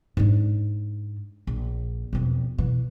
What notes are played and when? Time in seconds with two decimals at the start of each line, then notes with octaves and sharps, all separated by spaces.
0.17 G#2 D4
1.47 A#1
2.13 E1 F2
2.58 B2 E3